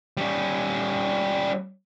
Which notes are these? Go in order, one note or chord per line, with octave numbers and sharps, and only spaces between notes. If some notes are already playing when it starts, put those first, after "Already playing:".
G3 C#4